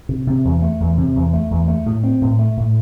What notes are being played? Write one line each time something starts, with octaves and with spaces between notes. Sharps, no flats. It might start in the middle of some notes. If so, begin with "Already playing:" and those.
C3
C3
E2
A3
E2
C3
E2
A3
E2
A3
A2
C4
A2
A3
A2